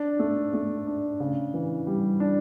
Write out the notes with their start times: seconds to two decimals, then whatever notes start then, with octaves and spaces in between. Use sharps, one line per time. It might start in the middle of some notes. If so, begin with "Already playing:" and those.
Already playing: D4
0.19 A3
0.53 A3
0.87 D4
1.20 C#3
1.54 E3
1.87 G3
2.20 D4